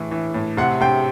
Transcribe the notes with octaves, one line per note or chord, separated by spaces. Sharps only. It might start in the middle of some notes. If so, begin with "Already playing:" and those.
Already playing: A2 E3
E3
A2
C3 F#5
C3 G5